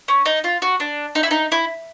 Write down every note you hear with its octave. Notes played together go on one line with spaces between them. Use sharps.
C#4
D#4
F4
F#4
D4
D#4
E4
D#4
E4